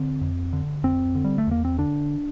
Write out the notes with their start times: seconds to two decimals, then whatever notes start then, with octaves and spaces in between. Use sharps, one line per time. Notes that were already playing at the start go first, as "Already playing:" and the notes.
Already playing: D3 C4
0.21 F2
0.53 D3
0.83 F2 C4
1.15 D3
1.24 G3
1.38 A3
1.47 E2 A#3
1.65 C4
1.78 D3 D4